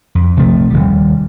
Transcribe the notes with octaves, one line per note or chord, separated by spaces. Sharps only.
F2
A#1 C3 F3 A3
D#1 D#3 G3